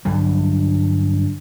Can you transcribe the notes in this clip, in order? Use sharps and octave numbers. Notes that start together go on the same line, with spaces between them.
G2 D3 F#3 G3